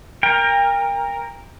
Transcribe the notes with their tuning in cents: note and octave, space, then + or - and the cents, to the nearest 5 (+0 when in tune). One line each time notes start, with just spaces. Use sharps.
A#4 +0 G5 +35